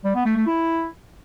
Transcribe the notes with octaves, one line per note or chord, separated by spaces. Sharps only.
G3
B3
A3
A3
E4